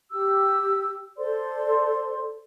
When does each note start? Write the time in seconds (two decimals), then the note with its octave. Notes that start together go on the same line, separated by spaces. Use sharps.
0.11 G4 E6
1.18 A4 C5 D5 C6